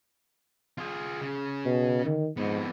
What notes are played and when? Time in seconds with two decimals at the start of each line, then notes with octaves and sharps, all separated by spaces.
0.78 F4 G#4
1.21 C#3
1.65 B2
2.05 D#3
2.37 F2 G#2 B3